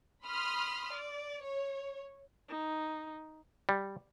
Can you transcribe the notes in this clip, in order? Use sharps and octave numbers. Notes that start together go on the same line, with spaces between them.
B5 C6 D#6 F6
D5
C#5
D#4
G3